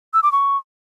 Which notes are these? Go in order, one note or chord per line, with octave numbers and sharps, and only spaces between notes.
E6
D6
C#6